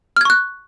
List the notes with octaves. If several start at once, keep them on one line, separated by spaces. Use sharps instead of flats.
C#6 F6 F#6 G#6